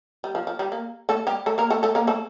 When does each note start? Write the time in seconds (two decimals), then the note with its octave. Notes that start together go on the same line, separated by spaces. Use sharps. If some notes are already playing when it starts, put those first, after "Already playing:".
0.24 G3
0.35 F3
0.47 F3
0.59 G3
0.72 A#3
1.09 A3 A4
1.27 G3 G4
1.46 A3 A4
1.58 A#3 A#4
1.70 A3 A4
1.83 A3 A4
1.95 A#3 A#4
2.07 A3 A4